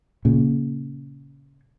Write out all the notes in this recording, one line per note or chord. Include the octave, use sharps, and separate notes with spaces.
A#2 C#3